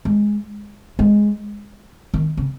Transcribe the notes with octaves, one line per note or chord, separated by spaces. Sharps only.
G#3
G#3
D#3
C#3